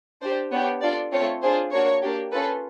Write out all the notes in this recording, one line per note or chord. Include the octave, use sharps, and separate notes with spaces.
D4 G4 C5
B3 D4 G4 C#5
D4 F4 A4 D5
A3 C4 F4 C#5
D4 F4 G#4 C5
A#3 D4 F#4 C#5
A#3 D4 G4
C#4 F4 A4 B4